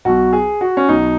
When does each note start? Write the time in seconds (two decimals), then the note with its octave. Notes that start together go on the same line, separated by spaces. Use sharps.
0.05 B1 B2 F#3 F#4
0.33 G#4
0.61 F#4
0.77 C#4
0.89 B1 B2 F#3 D#4